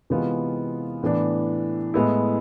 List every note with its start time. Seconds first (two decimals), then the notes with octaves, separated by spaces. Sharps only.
0.10 C3 E3 G#3 B3 F4
1.03 A2 E3 B3 D4
1.94 A2 G#3 B3 E4